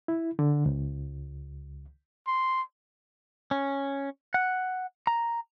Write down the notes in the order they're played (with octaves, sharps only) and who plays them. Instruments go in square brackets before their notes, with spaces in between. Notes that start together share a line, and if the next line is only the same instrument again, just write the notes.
[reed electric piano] E4
D3
C#2
[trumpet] C6
[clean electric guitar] C#4
F#5
A#5